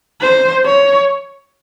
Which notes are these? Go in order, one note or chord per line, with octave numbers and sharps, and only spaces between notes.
C5
C#5